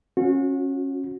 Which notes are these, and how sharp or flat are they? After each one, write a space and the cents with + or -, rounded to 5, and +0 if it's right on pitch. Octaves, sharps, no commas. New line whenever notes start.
C#4 -20 F#4 -30